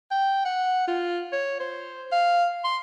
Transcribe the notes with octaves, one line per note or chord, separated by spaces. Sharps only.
G5
F#5
F4
C#5
C5
F5
C6